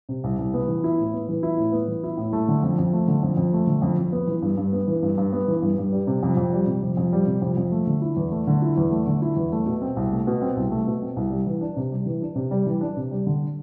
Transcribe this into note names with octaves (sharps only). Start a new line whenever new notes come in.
C3
C2
C2
B3
E3
E4
A2
B3
E3
E4
A2
B3
E3
E4
A2
A3
D3
F2
F2
A3
D3
F2
F2
A3
D3
F2
F2
B3
E3
G2
G2
B3
E3
G2
G2
B3
E3
G2
G2
G3
C3
F2
F2
G3
C3
F2
F2
G3
C3
F2
F2
A3
D3
E4
E2
A3
D3
E4
E2
A3
D3
E4
E2
A3
B2
C4
C2
A3
B2
C4
C2
A3
B2
C4
C2
G3
E3
D4
C3
G3
E3
D4
C3
G3
E3
D4
C3
G3
D3